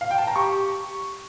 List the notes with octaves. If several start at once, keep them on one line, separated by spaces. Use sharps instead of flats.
F5
G5
A5
A#5
G4 C#6